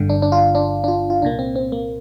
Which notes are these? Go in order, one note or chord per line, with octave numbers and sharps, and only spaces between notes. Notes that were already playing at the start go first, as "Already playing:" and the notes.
Already playing: G1 G2 D3
D4
D4
F4
D4
D4
F4
F4
C2 A#2 A#3 D4
C4
C4
A#3